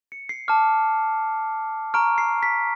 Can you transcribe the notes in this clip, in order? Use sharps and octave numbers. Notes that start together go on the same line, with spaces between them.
C#7
C7
A5 D6 F6
A#5 C#6 F6 D7
C7
B6